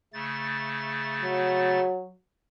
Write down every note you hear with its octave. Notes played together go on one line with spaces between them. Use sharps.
C#3 A3 A6
F#3